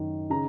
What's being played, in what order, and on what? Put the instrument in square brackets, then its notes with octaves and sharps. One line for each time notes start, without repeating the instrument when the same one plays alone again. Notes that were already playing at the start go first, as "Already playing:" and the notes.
Already playing: [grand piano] F#2 D#3
C#3 A#5